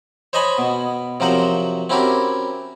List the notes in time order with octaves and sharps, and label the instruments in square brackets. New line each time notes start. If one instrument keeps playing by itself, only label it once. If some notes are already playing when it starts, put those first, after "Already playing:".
[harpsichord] C5 C#5 D#5 G#5 A5 B5
B2
C3 F3 F#3 A#4 C5 F#5
C4 C#4 E4 F#4 G4 A#4